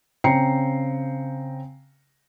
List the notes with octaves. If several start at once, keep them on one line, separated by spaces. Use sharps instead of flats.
C#3 C4 G5 A#5 C7 C#7